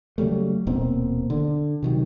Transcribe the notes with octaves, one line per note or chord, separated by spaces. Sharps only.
C#3 F#3 G3 A3
D#1 B2 A#3 C4
D3
C3 D#3 F#3